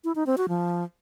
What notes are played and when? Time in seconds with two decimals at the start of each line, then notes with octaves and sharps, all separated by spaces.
0.04 E4
0.15 D#4
0.27 C4
0.38 F#4
0.49 F3